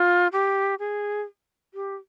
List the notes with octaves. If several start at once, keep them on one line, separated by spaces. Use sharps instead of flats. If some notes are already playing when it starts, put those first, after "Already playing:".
Already playing: F4
G4
G#4
G4